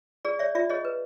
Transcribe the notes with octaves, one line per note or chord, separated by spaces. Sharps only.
G#4 D5
C#5 D5 E5
F4 D5 E5
G#4 C#5 D#5
B4